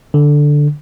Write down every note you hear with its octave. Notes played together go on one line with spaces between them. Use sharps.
D3